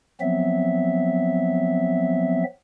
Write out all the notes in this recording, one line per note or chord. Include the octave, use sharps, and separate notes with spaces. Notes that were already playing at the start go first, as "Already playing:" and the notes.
F3 F#3 B3 C4 E5